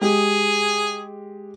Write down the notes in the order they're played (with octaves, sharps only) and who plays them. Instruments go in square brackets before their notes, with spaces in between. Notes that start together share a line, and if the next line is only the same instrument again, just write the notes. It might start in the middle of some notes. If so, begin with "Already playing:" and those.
[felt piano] G#3 G4 [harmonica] G#4